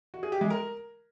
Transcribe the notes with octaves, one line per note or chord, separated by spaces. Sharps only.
F#4
G#4
G4
G#3
A#4